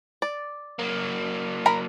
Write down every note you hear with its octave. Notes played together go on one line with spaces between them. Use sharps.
D5
F#3 A#3
A#4 A#5 B5